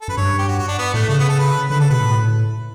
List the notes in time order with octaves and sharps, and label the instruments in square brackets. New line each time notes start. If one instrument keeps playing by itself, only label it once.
[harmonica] A4
[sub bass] F#2 [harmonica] B4
[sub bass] G2 [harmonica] C#5
[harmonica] G4
F#4
F#4
D4
B3
[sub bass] A2 [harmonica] A3
[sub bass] C#3 [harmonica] A3
[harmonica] B3
A4
B4
[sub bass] D3 [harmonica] B4
[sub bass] C#3 [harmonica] A4
[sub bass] B2 [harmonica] B4
[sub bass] A2